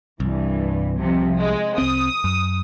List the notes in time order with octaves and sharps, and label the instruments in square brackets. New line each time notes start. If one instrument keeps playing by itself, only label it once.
[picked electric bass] C2 [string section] G2 E3
[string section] C3 F3
G#3
[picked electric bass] C2 C4 [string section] D#6
[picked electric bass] F#2